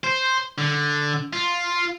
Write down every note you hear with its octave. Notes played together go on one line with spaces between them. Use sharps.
C5
D3
F4